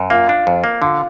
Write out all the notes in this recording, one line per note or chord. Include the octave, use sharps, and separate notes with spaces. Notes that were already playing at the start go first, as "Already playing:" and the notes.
Already playing: F#2
A#3 F4
D4
F2
A#3
D3 F4